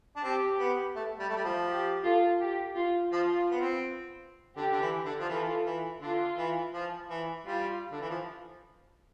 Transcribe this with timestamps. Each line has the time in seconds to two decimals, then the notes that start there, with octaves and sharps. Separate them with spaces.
0.16 D4
0.23 C4 G4
0.59 B3
0.96 A3
1.19 G3
1.29 A3
1.36 G3
1.44 F3
1.68 G4
2.04 F4 A4
2.41 G4
2.76 F4
3.12 F3 F4
3.50 B3
3.60 C4
4.57 D3 G4
4.71 D3
4.81 E3
5.05 D3
5.19 F3
5.29 E3 F4 A4
5.65 E3
6.01 D3 F4
6.38 E3
6.73 F3
7.10 E3
7.46 G3 F4
7.91 D3
8.00 E3
8.09 F3